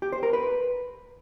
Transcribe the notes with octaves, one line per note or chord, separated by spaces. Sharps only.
G4
C5
A#4
B4